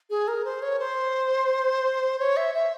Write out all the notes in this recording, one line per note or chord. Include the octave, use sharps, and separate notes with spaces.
G#4
A#4
C5
C#5
C5
C#5
E5
E5